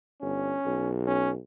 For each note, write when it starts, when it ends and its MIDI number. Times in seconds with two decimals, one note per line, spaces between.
0.21 0.55 31
0.21 0.90 61
0.65 1.38 35
1.07 1.31 61